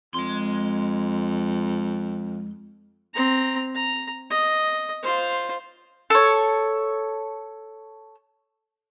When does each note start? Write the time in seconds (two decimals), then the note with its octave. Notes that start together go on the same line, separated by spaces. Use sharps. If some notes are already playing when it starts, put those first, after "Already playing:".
0.14 F2 G#3 C6
3.14 C4 A#5
3.75 A#5
4.30 D#5
5.02 F4 C5
6.10 A4 C#5